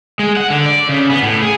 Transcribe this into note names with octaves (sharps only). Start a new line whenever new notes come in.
G#3
F#5
D3
D5
C#3
B3
A2
G#4